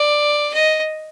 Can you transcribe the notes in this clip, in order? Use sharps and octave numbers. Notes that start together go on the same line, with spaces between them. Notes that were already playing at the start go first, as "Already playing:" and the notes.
Already playing: D5
D#5